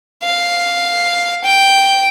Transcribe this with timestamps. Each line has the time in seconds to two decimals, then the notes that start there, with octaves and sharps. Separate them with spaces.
0.23 F5
1.44 G5